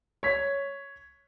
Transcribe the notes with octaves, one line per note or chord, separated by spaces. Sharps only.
C#5 B6